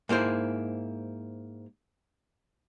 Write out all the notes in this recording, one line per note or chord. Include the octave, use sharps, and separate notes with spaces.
G#2 A#3 E4 C5